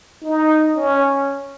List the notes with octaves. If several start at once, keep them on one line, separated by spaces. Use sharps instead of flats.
D#4
C#4